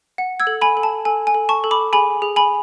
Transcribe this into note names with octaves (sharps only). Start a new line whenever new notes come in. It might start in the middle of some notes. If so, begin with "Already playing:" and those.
F#5
E6 G#6
A4
G#5 B5
A4
A5
A4 G#5
G#5
A4
A5 C#6
A4
B5 D6
G#4 G#5 B5
G#4
G#5 B5